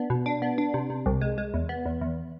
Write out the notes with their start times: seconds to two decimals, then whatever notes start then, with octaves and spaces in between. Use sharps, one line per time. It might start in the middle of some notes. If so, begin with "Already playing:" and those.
Already playing: B3 D4
0.10 B2
0.26 D4
0.42 B3
0.58 D4
0.74 C3
0.90 C3
1.06 C2
1.21 G#3
1.38 G#3
1.54 E2
1.69 B3
1.86 E2
2.01 E2